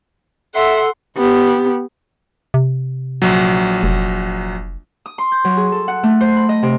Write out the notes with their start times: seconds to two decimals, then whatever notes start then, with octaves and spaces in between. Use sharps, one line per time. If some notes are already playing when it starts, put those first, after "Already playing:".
0.55 A4 E5 F#5 C6
1.17 B3 G4
2.54 C3
3.22 A#1 F#3
3.83 F1
5.06 D#6
5.18 C6
5.32 G6
5.45 F#3
5.57 G#4
5.72 A4
5.88 F#5
6.03 A3
6.21 C5
6.37 B5
6.49 D#5
6.63 C3